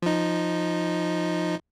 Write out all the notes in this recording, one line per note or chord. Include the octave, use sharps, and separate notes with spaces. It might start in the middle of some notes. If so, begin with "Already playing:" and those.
F3 D#4